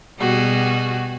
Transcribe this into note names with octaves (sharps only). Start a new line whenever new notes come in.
B2 G3 F#4 G#4